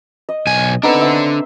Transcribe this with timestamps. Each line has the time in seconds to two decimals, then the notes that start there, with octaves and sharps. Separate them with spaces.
0.29 D#5
0.47 B1 G#5
0.83 B3 C4 D4 D#4 A4
1.01 C5 E5